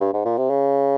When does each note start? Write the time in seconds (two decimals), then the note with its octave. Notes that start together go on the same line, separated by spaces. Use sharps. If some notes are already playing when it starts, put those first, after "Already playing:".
0.01 G2
0.13 G#2
0.25 A#2
0.38 C3
0.50 C#3